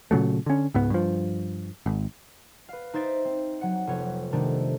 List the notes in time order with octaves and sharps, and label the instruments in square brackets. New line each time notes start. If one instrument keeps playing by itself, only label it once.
[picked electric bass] A#2 C#3 F#3 A3
D3 C#4
C#2 G#2 B3
G2 F3
G#1
[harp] B4 F5
D#4 C5 E5 A6 D7
C4
F#3 F#5
F1 B3 C#5
C3 D#3 A3 D4